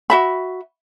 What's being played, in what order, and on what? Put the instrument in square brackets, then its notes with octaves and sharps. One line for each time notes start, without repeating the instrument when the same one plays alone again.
[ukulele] F#4 E5 B5